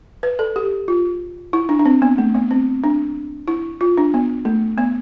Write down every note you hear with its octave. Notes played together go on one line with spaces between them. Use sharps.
B4
A4
G4
F4
E4
D4
D4
C4
B3
A3
B3
C4
D4
E4
F4
D4
B3
A3
B3